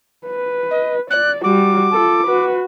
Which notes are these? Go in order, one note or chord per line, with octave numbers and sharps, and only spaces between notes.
B4
D#5
D5 F#6
G3 F#4 D6
F4 A4
F#4 B4